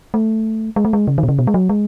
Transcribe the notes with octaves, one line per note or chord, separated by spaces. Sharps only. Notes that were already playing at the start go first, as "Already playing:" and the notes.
A3
G#3
A3
G#3
C#3
D#3
B2
C#3
B2
G#3
F#3
G#3